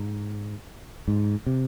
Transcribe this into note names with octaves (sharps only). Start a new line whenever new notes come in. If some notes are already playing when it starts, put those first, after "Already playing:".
Already playing: G#2
G#2
C3